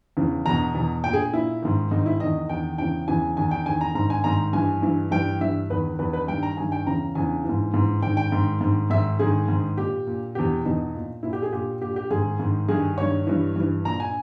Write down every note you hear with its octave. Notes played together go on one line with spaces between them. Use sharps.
E2 C#3 E3
E2 B2 A#5
E2 B2
A#2 G5
G#4
A#2 E4
G#2 D#3
G#2 D#3 D#4
E4
E2 D#3 D#5
E2 D#3 G5
E2 C#3 E3 G5
E2 C#3 E3 G#5
E2 D#3 G#5
G5
E2 D#3 G#5
A#5
G#2 D#3 A#5
G#5
G#2 D#3 A#5
G2 E3 G#5
G2 E3
G2 E3 G5
G2 E3 E5
E2 D#3 B4
E2 D#3 B4
B4
G2 D#3 G5
A#5
G2 D#3 G#5
G5
E2 C#3 E3 A#5
E2 C#3 E3 G#5
G#2 E3
G#2 E3
G#2 D#3 G5
G5
G#2 D#3
G#2 D#3
G#2 D#3 E5
G#2 D#3 G#4
G#2 D#3
A#2 G4
A#2
E2 B2 G4
E2 B2 D#4
A#2
A#2 E4
G4
G#4
A#2 G4
A#2 G4
G4
G#2 D#3 G#4
G#2 D#3
G2 D#3 G#4
G2 D#3 C#5
G2 E3
G2 E3
A#2 A#5
G#5